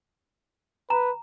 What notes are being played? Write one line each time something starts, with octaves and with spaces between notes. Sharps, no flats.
B4 A#5